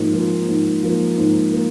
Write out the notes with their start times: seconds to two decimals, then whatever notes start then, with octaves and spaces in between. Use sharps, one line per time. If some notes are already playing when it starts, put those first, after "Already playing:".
Already playing: G#2 F3 A#3
0.12 F3 A#3
0.48 G#2
0.82 F3 A#3
1.18 G#2
1.52 A#3